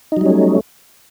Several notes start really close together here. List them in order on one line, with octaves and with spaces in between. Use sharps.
D#4 F#3 G3 C#4 A3